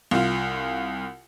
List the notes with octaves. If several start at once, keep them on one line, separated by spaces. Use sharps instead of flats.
C2 F4